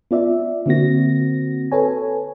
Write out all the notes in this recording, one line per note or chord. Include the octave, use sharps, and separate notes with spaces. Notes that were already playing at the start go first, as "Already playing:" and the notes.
B3 F4 D5 E5
D3 A#3 C4 F#4 A#6
A4 B4 C#5 G#5